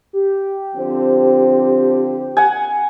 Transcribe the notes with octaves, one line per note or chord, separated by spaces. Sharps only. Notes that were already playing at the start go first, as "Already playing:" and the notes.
G4
D3 F3 C4
F#5 G#5